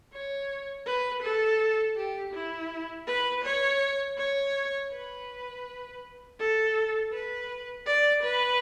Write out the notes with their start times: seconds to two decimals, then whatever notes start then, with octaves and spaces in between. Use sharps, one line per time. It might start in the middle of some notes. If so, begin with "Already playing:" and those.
0.13 C#5
0.86 B4
1.22 A4
1.96 G4
2.33 E4
3.06 B4
3.44 C#5
4.18 C#5
4.92 B4
6.39 A4
7.12 B4
7.86 D5
8.23 B4